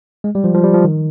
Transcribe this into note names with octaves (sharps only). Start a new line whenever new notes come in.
G#3
G3
F3
F3
G3
F3
D#3